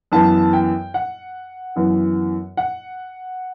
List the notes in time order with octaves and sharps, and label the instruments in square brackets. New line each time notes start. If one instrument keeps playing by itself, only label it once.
[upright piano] F#2 E3 B3 A5
G5
F#5
F#2 E3 B3
F#5